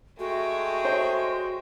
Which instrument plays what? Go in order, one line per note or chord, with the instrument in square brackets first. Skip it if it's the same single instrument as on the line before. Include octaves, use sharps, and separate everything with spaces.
[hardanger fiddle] G#3 G5 [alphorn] A3 [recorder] F#4
[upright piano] C5 D#5